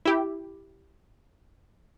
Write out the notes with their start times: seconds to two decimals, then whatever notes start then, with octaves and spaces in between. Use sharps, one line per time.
0.05 E4 G4